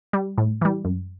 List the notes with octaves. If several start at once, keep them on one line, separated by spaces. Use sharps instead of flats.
G3
A2
E3 G3
F#2